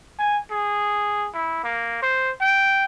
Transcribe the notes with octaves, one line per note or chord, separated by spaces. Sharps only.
G#5
G#4
E4
A#3
C5
G5